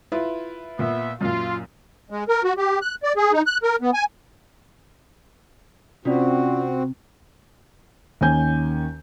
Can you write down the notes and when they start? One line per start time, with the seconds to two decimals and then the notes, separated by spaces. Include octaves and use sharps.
0.12 E4 F4 B4
0.79 A#2 B3 E5
1.21 F#2 A#2 F4
2.10 G#3
2.28 A#4
2.44 F#4
2.57 G4
2.82 F#6
3.03 D5
3.17 G#4
3.33 D#4
3.46 F#6
3.63 A#4
3.81 B3
3.94 G#5
6.05 C3 C4 C#4 F4 F#4 D5
8.21 D#2 D#3 C#4 G#5 G6